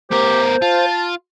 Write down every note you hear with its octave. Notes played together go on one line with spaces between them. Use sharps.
B3 G4 A#4 C5
F4 A5